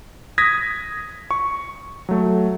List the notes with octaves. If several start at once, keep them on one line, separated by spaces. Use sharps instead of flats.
D#6 G#6 A#6 B6
C#6
F#3 A3